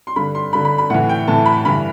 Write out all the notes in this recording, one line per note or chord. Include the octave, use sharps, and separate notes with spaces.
C6
G2 D3 B5
C6
G2 D3 B5
B5
B5
A2 E3 F#5
G5
A2 E3 A5
B5
G2 E3 B5